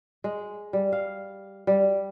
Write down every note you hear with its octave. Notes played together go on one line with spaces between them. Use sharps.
G#3
G3
F5
G3